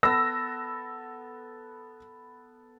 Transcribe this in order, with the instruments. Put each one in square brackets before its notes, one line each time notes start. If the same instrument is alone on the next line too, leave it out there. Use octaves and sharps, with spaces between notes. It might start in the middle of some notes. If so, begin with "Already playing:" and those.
[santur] B3 A4 [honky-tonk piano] E6 A#6